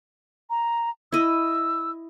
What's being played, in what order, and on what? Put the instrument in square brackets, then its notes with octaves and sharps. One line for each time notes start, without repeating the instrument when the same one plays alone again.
[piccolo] A#5
[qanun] E4 D#5 [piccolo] E6